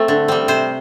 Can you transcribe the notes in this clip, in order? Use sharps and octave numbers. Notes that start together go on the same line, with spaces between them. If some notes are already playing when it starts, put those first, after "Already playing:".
Already playing: A3 C4
D3
G3 C4
C3 C5